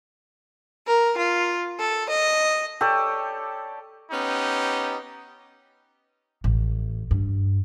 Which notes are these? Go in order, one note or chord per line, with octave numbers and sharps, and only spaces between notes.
A#4
F4
A4
D#5
G4 A4 C#5 D5
B3 C#4 D#4 G4
A1
G2